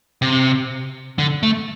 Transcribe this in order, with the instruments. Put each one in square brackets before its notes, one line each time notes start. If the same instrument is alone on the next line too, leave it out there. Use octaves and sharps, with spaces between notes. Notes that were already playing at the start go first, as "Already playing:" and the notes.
[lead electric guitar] C3
D3
A3